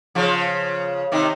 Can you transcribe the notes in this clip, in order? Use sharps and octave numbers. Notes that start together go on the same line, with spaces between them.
C#3 F3
C3 D#3